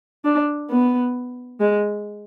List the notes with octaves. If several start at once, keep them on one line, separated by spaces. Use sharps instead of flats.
D4
B3
G#3